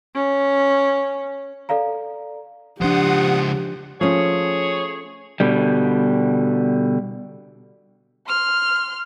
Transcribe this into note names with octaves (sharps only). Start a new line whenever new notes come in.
C#4
A4 D5 F5 A#5
C#2 F3 D4 G4 C5 F#5 D#6
F3 A3 C#4 G#4 C#5
B2 D3 G3
C6 F6